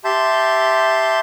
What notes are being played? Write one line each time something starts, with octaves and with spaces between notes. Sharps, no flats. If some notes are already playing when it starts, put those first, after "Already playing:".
G4 E5 A5 C6 G6